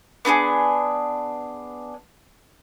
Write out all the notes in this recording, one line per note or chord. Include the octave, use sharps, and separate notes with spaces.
B3 D4 G4 G#4